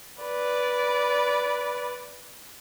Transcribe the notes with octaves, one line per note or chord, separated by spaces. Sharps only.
B4 D5